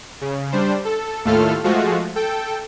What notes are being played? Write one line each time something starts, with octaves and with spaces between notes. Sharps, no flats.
C#3
G3 D4 C5
A4
D#2 A2 A3 F4 A4 F6
F3 G#3 A3 F4 F#4
A4 G5